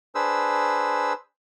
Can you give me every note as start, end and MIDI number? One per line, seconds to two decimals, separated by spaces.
0.15 1.13 62
0.15 1.13 68
0.15 1.13 71
0.15 1.13 72
0.15 1.13 88